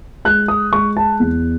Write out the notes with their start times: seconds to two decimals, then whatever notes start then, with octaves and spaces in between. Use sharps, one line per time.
0.25 G#3 F#6
0.48 D#6
0.72 G#3 C#6
0.97 A5
1.20 E2